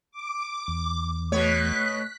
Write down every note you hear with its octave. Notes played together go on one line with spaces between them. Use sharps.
D6
E2
B2 A3 B3 C#5 F#6 B6